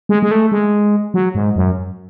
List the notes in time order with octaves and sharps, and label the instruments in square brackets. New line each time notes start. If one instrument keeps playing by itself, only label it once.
[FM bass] G#3
G#3
A3
G#3
F#3
G#2
F#2